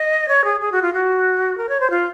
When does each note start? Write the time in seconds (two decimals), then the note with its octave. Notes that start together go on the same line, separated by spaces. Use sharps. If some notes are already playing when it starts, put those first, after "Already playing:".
Already playing: D#5
0.28 C#5
0.45 G#4
0.61 G#4
0.72 F#4
0.82 F4
0.93 F#4
1.58 A#4
1.69 C#5
1.80 C5
1.90 F4